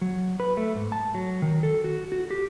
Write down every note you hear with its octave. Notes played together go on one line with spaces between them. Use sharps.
F#3
B4
A3
G#2
A5
F#3
D#3
A4
F#4
F#4
G4